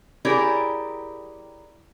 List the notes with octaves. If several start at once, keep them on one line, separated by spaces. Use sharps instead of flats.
E4 G4 G#4 A#4 C#5 D5